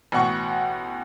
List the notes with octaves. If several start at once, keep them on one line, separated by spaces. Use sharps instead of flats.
A1 B2 F#5 C#6